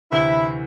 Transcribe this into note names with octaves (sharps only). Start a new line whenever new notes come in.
D2 C3 E3 E4